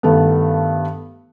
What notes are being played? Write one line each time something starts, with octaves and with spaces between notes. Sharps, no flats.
G2 D#3 A3 B3